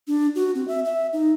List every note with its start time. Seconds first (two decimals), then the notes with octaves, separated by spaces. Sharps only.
0.08 D4
0.36 F#4
0.55 C4
0.68 E5
0.85 E5
1.13 D#4